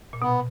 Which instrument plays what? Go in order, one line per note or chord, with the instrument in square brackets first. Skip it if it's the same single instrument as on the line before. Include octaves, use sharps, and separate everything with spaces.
[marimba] A#2
[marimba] B2 [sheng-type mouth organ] B3